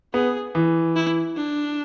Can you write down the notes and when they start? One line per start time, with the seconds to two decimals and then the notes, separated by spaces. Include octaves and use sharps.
0.14 B3 G#4
0.55 E3
0.96 E4
1.36 D4